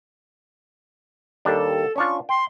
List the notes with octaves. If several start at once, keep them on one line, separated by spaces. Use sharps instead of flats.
D#2 G3 D4 A4
C#4 D4 F4 C#6
G5 C6